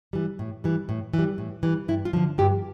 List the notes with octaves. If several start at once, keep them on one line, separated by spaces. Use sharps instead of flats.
E3 G3
A2
E3 G3
A2
E3
G3
A2
E3 G3
G2 E4
F4
D3 F3
G2 G4